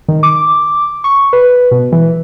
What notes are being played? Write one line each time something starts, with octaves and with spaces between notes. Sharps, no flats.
D#3
D6
C#6
B4
B2
E3